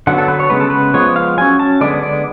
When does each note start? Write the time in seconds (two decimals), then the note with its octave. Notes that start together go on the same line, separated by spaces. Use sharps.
0.07 D3 F#3 B3 F#5
0.18 A4
0.28 B4
0.40 C#5
0.50 C#3 G#3 B3 B4
0.60 A4
0.70 B4
0.94 F3 G#3 B3 C#5
1.16 F5
1.38 F#3 C#4 G#5
1.59 A5
1.81 D3 G#3 B3 D5
2.03 D5